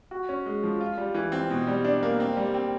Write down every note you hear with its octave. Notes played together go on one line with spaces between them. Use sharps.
F#4
C#4
G#3
F3
F4
G3
E3
C4
B2
G3
D4
A#3
C4
G3
C4